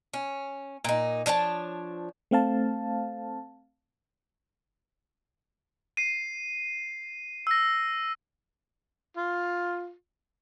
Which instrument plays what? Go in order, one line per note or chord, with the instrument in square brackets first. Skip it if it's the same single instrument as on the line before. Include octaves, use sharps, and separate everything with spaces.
[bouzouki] C#4
A#2 D#4
F3 D4 C#5 A5
[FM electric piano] A3 C4 F5 A5
[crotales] C7 D#7
E6 A#6
[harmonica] F4